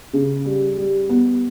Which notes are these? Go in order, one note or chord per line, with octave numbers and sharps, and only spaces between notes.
C#3
G3
G3
B3